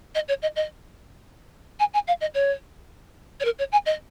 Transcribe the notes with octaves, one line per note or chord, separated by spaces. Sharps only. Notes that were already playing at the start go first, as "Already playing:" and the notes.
D#5
C#5
D#5
D#5
G#5
G#5
F5
D#5
C#5
C#5
A#4
C#5
G#5
D#5